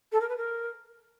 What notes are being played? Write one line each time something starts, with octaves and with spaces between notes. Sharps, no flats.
A4
A#4
B4
A#4